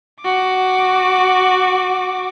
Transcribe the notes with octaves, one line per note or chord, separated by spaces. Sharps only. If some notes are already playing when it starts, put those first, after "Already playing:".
F#4 D6